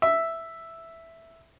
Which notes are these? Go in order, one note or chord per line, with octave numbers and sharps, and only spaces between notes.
E5